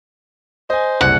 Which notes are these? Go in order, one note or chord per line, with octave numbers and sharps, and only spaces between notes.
C5 D#5 G#5
F#1 C2 F#5